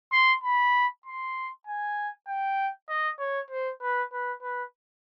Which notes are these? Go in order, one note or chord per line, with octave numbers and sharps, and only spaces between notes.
C6
B5
C6
G#5
G5
D#5
C#5
C5
B4
B4
B4